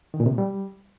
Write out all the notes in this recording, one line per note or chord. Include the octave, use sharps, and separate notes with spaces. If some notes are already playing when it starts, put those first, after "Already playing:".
D#3
A#2
C3
A#2
G3